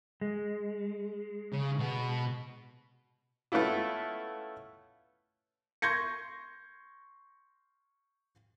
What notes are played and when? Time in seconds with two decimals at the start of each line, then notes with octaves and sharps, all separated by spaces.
0.21 G#3
1.52 C#3
1.78 B2 B3
3.52 A3 B3 C#4 E4 F4
5.82 C6 C#6 G6 G#6 A#6 C#7